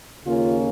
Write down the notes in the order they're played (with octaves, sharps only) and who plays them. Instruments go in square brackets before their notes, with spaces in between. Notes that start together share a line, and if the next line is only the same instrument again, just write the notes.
[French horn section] D#2 C#3 A#3 C#4 F4